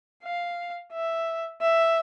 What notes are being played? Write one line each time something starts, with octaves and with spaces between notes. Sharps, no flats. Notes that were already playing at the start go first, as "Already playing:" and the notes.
F5
E5
E5